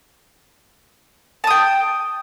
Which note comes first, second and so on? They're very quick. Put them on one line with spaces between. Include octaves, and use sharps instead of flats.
A5 D#6 G5